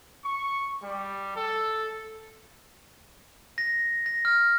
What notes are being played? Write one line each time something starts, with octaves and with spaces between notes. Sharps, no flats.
C#6
G3
A4
A#6
A#6
F6